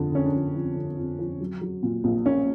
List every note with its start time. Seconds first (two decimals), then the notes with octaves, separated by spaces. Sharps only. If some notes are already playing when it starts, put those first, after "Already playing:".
Already playing: F2 D3
0.12 D3 C#4
0.25 D4
0.33 F2
0.54 F3
0.75 D3
0.97 F2
1.19 F3
1.40 F#3
1.61 F#3
1.83 A#2
2.04 A#1
2.25 A#3 C#4